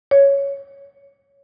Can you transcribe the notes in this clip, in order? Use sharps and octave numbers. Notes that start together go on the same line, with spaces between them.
C#5